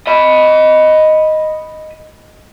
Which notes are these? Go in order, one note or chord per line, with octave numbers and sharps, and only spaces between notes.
D#5 B5